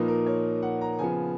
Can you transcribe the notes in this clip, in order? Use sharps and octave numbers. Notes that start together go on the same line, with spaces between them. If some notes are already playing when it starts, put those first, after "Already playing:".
Already playing: A#2 F3 A#3 D#4 B4
A#4
C#5
F#5
A#5
C#3 F3 B3 G#5